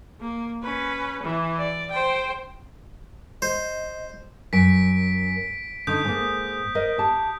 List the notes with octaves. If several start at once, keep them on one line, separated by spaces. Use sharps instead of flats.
A#3
C#4 B4
E3
D5
C5 G5
C5 D#5
F#2 B6 D7
D3 C#4 D#4 D#6 G6
G#2 A#3
A#4 C5 D#5
G4 A5